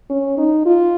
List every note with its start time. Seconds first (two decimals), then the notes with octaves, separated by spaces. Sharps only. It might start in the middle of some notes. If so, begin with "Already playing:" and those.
0.10 C#4
0.38 D#4
0.66 F4